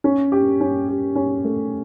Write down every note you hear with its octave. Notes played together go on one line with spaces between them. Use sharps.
C#4
G4
C#4
G4
C#4
A3